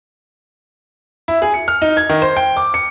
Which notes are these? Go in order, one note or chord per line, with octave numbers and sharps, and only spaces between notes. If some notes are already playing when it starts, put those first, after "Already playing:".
E4
G#4
C#7
F6
D#4
G#6
D#3
C5
G5
D6
C#7